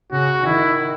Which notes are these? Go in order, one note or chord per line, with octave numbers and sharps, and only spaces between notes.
C#3 F#4
D#3 E4